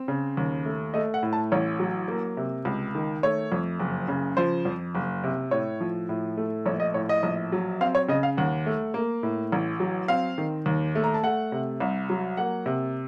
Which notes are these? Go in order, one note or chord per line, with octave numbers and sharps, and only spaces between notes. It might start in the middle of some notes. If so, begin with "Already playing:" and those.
Already playing: C4
C#3
D#2
A3
A3 D#5
F#5
A2
A5
A1 C#5
F#3
A#3
C3
C#2
D#3
A3 C#5
F2
F#1
C#3
F3 C5
F2
F#1
C3
A2 C#5
F3
A2
A3
A#1 C#5
D#5
A2 C#5
D#5
A#1
F#3
C4 F5
C#5
C#3 D#5
F5
D#2 F#5
A3
A#3
A2
A1
F#3
C4 F5
D#3
D#2
A3
A#5
A5
A3 F#5
C3
C2
F#3
A#3 F#5
C3